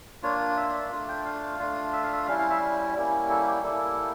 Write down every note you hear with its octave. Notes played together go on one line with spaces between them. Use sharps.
A#3 D4 F4 C#5
E5
E5
A3 D4 F4
G5
F5
A3 D4 F4
E5
F5
E5
G3 C#4 E4 F5
F5
E5
G3 A#3 C#4 E4
A4
G4
G3 A#3 E4 A4